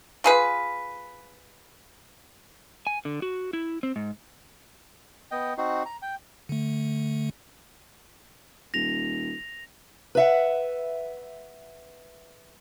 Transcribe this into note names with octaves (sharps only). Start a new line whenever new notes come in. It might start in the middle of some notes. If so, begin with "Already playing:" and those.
F4 G#4 B4
G#5
D3
F#4
E4
C4
G#2
B3 D#5 G5
C4 D#4 F#4
A#5
G5
D3 A3
D#1 A#6 F7
B4 E5 F#5